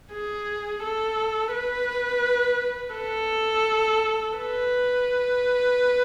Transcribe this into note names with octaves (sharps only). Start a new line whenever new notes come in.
G#4
A4
B4
A4
B4